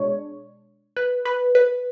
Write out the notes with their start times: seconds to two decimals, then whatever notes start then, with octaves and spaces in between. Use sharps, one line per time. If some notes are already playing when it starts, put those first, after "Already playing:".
Already playing: B2 G#3 D4 C#5
0.97 B4
1.25 B4
1.55 B4